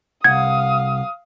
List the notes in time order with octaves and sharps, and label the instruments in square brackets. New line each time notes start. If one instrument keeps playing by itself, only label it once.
[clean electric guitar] C2 F#5 [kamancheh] F5 D#6 [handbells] G#6